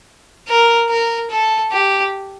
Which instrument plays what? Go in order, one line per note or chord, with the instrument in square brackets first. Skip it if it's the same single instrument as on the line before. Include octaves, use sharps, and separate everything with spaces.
[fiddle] A#4
A#4
A4
G4